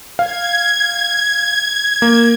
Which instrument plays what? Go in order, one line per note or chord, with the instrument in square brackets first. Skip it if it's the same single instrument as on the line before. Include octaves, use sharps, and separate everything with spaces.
[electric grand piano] F5 [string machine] G#6
[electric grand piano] A#3